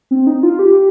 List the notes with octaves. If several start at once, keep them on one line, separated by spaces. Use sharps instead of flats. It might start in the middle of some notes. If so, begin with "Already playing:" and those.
C4
D#4
F4
G4